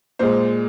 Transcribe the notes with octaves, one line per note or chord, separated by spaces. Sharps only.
A#2 G#3 C5